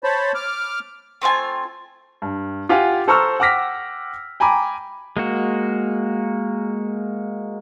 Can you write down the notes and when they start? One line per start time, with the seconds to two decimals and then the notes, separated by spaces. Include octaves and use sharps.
0.04 C5 C#5 A5 B5
0.35 D6 F6
1.22 A3 C4 F4 G#5
2.22 G2
2.69 F4 G4 F5 F#5 G#5
3.08 A4 C5 A#5 C#6 E6 F6
3.40 F#5 G5 D6 F6 A#6 B6
4.40 G5 G#5 A#5 B5 D6
5.17 G#3 A#3 F#4